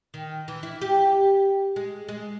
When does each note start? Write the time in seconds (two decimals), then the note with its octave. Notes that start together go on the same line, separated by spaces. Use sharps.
0.14 D#3
0.48 E3
0.63 E4
0.81 G4
1.76 G#3
2.08 G#3